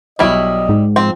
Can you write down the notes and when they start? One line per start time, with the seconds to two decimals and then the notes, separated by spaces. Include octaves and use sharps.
0.19 B1 G3 E4 D#5 C#6 F6
0.69 G#2
0.96 F3 C4